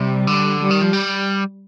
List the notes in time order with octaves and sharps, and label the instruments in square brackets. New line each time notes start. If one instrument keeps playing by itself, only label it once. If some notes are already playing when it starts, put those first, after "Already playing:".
Already playing: [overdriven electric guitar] C3 [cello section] G3
[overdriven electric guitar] D3
[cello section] G3
[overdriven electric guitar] D#3
F3
G3